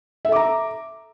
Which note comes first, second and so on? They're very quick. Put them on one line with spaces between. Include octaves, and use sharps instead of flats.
E5 A4 D6 A#5